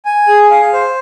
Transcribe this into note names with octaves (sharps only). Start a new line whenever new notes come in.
G#5
G#4
F5
C5